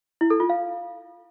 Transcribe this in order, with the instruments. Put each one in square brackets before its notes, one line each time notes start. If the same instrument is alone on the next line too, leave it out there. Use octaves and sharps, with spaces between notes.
[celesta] E4
A4
F4
F5